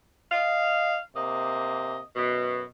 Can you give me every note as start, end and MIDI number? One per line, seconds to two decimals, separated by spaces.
0.32 0.97 75
0.32 0.97 77
1.16 1.99 48
1.16 1.99 58
1.16 1.99 75
2.16 2.63 42
2.16 2.63 47